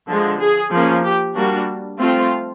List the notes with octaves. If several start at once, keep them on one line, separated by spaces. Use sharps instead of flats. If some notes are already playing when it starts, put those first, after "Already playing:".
D3 F3 G#3
G#4
F3 A#3 C#4
G4
G3 A#3 D4 F#4
F3 A3 C4 F4